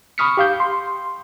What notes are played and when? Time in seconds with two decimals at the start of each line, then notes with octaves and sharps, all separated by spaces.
0.18 B5 C#6 D#6 F6 B6 C#7
0.37 G4 F5 G6
0.60 C6